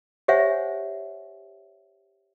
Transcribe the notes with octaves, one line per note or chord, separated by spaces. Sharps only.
G4 C5 C#5 E5 F#5 G#5